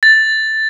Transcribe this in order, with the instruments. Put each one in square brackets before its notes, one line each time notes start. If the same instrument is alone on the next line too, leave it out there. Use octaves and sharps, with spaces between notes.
[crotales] A6